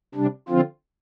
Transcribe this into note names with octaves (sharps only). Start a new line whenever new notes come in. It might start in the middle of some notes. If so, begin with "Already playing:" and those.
C3 G3 D4
D3 F3 C4 F4